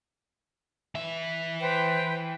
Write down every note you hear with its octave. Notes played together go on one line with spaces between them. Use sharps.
E3 E5
B4 C5 G5